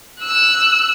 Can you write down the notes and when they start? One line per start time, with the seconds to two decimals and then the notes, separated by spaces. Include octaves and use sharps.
0.21 E6 F#6